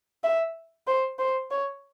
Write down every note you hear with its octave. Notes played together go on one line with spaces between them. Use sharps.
E5
C5
C5
C#5